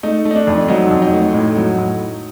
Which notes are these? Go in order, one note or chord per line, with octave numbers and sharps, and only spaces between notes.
A3 D#4
A3
D#4
D4
F2
F#3 D#4
F2
D#4
A3
A2
F#3
A2